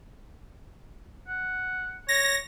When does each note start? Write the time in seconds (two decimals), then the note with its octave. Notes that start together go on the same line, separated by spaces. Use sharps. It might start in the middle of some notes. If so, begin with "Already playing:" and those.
1.28 F#5
2.08 C#5 A#6